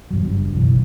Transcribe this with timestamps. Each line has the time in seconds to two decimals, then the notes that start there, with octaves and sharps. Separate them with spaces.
0.11 E2 G2 F#3
0.26 F#1 G2
0.52 F#1 B1 E3